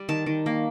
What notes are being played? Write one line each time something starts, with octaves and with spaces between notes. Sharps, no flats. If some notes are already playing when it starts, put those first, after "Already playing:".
Already playing: G3
D#3 A5
D#3
A#3